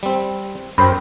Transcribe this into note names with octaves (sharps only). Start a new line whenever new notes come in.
G3 C4
F#2 C5 G5 B5